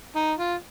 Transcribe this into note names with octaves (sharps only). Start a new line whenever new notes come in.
D#4
F4